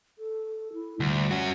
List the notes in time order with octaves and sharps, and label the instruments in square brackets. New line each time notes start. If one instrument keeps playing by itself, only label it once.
[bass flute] A4
E4
[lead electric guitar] D2 [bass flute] G3
[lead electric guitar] C#4 F#4